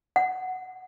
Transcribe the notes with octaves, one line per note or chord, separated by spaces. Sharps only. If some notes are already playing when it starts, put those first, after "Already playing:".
F#5